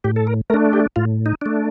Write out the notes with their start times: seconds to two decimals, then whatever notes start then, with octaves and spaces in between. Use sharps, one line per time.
0.04 A2 G4
0.16 A4
0.27 A#4
0.50 A3 D4 A#4
0.73 G4
0.96 A2 F4
1.26 D#4
1.41 A3 D4